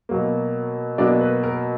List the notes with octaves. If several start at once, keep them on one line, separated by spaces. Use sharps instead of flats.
B2 F#3 A#3
B2 F#3 A#3 D4 D5
B4
A#4